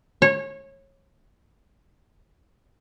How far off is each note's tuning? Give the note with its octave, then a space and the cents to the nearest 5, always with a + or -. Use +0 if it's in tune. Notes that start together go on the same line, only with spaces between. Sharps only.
C#5 -25